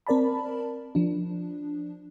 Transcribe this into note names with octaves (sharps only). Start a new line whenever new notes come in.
C4 A#4 D5 A5 B5
F3 D4